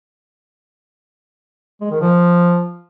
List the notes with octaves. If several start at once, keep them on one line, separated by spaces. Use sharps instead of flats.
G#3
D#3
F3